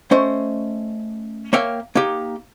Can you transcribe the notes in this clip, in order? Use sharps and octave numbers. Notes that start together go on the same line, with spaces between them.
A3 C#4 C5 D#5
A#3 C#5 E5 F5 G5
A#3 D#4 G4